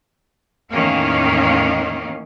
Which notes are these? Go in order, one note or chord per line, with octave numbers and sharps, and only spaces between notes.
E2 A2 D#3 A#3 C#4 F5